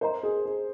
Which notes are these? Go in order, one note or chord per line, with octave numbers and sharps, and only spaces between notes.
A#4 C5 D#5 A#5
G#4
G#4